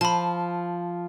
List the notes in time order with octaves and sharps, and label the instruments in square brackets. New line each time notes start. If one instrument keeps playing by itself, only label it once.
[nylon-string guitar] F3 [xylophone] A5 B5